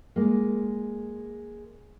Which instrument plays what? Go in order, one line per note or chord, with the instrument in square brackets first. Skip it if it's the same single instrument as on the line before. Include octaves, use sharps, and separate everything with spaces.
[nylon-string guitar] G#3 A#3